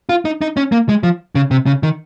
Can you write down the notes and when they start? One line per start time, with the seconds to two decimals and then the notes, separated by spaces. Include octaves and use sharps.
0.09 F4
0.25 D#4
0.41 D#4
0.57 C#4
0.72 A#3
0.89 G#3
1.03 F3
1.35 C#3
1.51 C3
1.66 C#3
1.83 D#3